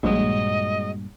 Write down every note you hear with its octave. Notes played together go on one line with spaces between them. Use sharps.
A#1 G2 A#2 F#3 G#3 D#5